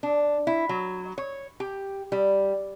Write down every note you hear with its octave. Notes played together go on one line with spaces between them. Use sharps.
D4
E4
F#3
C#5
G4
G3